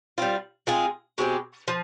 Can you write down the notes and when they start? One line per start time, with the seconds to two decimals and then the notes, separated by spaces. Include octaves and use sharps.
0.18 G3 C4 F4
0.67 G#3 C4 F4 G#4
1.18 B2 G#3 C4 G4
1.68 F3